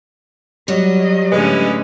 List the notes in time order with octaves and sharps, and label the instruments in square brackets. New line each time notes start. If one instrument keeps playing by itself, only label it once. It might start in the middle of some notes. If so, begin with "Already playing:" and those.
[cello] F#3 D#5 [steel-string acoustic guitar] G3 F#4 C#5
[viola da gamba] A2 D3 C#4 [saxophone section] G#3 B4